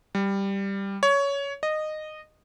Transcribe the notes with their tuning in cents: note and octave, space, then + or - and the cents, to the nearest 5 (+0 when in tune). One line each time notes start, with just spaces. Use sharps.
G3 +5
C#5 +15
D#5 -15